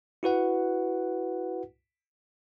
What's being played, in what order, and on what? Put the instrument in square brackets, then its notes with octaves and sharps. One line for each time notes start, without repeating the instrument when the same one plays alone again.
[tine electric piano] E4 F#4 B4 F#5